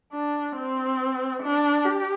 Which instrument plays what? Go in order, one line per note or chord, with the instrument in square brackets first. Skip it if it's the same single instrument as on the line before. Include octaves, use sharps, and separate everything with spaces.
[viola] D4
C4
D4
G4